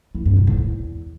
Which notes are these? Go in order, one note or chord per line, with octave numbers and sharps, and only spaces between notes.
E3
G2
B2
G#2
E2